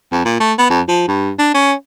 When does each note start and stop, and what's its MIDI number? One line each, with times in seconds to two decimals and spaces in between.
0.12 0.24 41
0.25 0.39 46
0.40 0.53 57
0.59 0.67 59
0.70 0.81 41
0.88 1.04 53
1.08 1.32 43
1.39 1.52 62
1.54 1.73 61